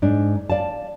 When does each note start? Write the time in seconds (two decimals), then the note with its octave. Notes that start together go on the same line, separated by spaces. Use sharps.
0.02 G#2 D4
0.50 D5 F5 A5